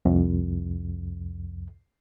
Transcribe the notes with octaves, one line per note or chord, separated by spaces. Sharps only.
C2 F2